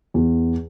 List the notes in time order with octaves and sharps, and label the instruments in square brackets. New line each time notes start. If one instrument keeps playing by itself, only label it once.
[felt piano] E2